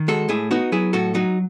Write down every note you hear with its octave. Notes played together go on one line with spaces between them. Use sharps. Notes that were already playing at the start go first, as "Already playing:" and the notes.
Already playing: D#3
G#3 F#4 A4
A2 E4 G#4
B3 D#4 F#4
F#3 E4 G#4
A2 F#4 A4
F#3 D#4 F#4